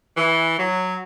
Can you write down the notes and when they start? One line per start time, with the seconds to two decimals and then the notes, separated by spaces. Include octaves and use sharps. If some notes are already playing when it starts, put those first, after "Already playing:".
0.17 E3
0.59 F#3